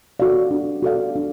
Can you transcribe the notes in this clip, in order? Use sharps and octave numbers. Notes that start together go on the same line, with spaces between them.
F#4 A4 D5 F5
D4
F#4 A4 D5 F5
D4